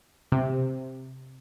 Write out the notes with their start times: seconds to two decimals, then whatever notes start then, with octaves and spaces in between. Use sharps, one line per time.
0.32 C3